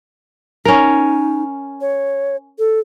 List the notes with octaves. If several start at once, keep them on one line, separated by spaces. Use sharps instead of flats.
C#4 D#4 A#4
C#5
A4